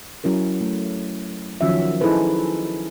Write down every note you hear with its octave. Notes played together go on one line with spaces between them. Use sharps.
F#3 C#4 E4 A#4
A3
D#3 F3 F#3 C#4 F#4 E5
D#4 E4 G#4 A4 B4 C5